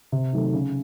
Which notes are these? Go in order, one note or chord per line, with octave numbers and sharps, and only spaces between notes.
C3
D#3 F#3 A3
C#3